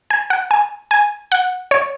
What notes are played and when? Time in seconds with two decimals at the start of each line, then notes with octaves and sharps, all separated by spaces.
0.10 G#5
0.30 F#5
0.51 G#5
0.91 G#5
1.32 F#5
1.71 C#5